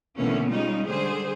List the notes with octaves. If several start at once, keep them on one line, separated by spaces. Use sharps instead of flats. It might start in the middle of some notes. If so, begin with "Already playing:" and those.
B2 D3 E3 A3 A#3 C#4
G3 G#3 C#4 D#4 F4
D3 G3 G#4 C5